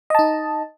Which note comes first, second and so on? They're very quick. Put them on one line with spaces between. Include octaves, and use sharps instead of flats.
D#5 A5 D#4